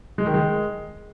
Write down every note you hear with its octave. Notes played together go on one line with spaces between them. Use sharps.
G#3
D#3
G#3